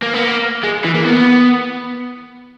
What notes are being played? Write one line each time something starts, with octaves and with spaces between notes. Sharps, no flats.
A#3
B3
A#3
G#3
E3
A#3
B3